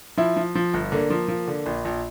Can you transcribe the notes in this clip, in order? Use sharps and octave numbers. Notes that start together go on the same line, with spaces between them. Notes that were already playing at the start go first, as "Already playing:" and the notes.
F3 E4
F3
F3
G1
D3 A#3
F3
F3
D3
A#1
A#1